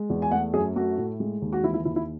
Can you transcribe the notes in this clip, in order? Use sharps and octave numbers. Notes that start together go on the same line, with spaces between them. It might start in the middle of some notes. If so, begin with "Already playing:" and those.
Already playing: G#3
E2
G#5
A3 F#5
F#2 G#4
A3 F#4
A2
G#3
D#2
F#4
E3 E4
E4
D#2 E4
E4